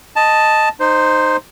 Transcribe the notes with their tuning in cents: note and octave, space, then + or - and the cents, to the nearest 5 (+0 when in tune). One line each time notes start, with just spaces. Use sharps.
D#5 +0 A5 +0
D#4 -15 C5 +0